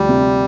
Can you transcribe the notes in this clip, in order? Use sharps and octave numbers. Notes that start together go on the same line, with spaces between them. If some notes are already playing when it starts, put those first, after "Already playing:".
Already playing: D2 F3 G3
C3